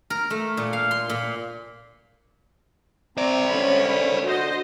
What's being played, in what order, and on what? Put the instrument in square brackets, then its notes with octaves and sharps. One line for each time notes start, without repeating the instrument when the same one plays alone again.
[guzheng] A#4
A3
A#2
F5
C6
A#2
[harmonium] C4 A#5 [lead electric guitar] C5 D5
[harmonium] D3 [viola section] C#4 C#5 B5
[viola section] F#4 C5 D#5